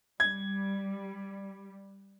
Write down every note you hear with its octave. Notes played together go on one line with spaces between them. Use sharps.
G3 G#6